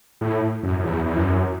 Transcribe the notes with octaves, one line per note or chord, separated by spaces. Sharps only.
A2
F#2
F#2
E2
E2
F#2